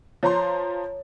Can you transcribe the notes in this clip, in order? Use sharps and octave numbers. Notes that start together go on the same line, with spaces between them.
F3 C#5 A#5 C6